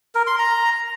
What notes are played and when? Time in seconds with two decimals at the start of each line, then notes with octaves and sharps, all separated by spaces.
0.15 A#4
0.27 C6
0.39 A#5